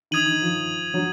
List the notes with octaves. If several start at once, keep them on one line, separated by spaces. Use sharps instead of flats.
D#3 D#6 G#6 D#7 F#7
D#3
F3
F#3